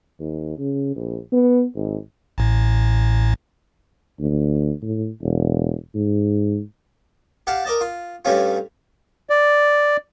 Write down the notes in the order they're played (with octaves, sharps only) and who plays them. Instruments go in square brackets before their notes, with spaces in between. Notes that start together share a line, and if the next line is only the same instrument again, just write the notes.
[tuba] D#2
C#3
A#1
B3
G#1
[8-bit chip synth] A1 A2
[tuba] D2
A2
E1
G#2
[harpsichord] G4 F5 F#5 A5
A#4 D5 D#5 A5
F4
G2 G3 A3 C#4 F4
[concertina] D5